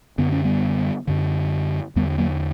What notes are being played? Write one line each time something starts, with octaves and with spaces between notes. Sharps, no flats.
F#2 D3 B3
C#4
G3 B3
F#2 D3
E2 D3 G3 B3
F#3 A#3